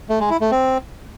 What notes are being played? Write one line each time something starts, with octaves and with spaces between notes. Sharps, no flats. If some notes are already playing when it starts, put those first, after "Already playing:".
A3
G#3
E4
A3
C4